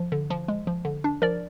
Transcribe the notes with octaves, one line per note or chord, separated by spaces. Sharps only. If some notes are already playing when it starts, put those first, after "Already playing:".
Already playing: F3
D3
F3
G#3
F3
D3
D4
F3 A#4 D5